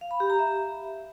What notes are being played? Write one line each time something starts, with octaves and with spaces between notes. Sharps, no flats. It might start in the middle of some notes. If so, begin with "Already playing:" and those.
F5
B5
G4
A#5
E5